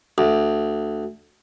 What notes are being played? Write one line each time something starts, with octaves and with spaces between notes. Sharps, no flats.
D2